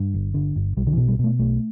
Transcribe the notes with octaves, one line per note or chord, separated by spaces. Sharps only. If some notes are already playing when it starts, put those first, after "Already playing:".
Already playing: G2
G1
D3
G1
B1 G3
D3
E3
B2
G3
B2 A3
B1 A3